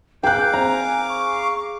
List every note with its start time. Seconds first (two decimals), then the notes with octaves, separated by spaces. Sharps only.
0.23 G#4 F5 G5 D6 F#6 G6
0.53 C4 G#5 A#5
1.09 C#6